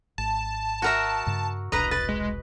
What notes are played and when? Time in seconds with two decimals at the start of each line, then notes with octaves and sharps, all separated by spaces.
0.18 G#1 A5
0.82 F#4 A#4 E5
1.27 G2 C#3
1.72 E1 C2 D4 B4 D#5 A#5
1.91 B4 A6
2.09 G#3